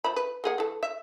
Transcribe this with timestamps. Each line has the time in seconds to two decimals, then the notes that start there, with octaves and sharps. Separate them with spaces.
0.04 F3 E5 B5
0.16 B4
0.44 A#3 G#4 F#5
0.58 E3 A4
0.83 E5